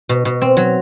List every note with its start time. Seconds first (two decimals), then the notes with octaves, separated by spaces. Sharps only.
0.09 B2
0.25 B2
0.41 C4
0.57 F#3